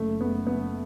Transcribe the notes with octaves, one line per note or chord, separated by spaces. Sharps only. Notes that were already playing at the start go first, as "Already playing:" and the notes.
Already playing: F#1 A3
F#1 B3
F#1 B3